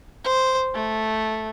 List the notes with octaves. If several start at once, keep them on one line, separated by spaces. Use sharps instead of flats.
C5
A3